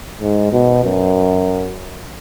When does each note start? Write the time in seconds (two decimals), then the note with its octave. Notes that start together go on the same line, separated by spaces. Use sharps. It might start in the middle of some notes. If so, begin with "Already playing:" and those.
0.21 G#2
0.53 B2
0.84 F#2